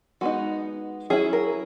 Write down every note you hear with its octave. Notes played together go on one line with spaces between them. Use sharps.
G#3 B3 D#4 F#4
F#3 C#4 E4 G#4
A#4